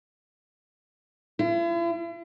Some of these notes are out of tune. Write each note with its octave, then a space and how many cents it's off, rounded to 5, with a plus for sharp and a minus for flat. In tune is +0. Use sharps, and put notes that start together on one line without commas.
E4 +45